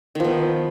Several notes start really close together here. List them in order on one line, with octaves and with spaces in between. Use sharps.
D#3 F3 B3